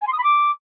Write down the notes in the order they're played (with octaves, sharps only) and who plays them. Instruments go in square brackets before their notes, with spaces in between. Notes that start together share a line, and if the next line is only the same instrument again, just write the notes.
[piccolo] G#5
C6
D#6
B5
D6